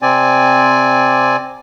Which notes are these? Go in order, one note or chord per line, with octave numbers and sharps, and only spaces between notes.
C3 C4 D5 G#5